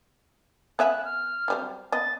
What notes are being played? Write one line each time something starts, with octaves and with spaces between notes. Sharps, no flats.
B3 C#4 E5 F#6
F6
F#3 G3 C4
B3 D#5 A6